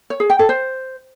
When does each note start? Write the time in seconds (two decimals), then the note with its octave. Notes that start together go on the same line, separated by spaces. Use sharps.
0.10 C#5
0.20 G#4
0.30 G5
0.39 A4
0.49 C5